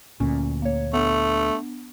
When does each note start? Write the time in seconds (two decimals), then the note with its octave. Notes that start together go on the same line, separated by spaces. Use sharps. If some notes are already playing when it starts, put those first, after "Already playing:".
0.20 D2 A#2 C#4
0.62 A#3 C#5
0.93 A3 B3 D4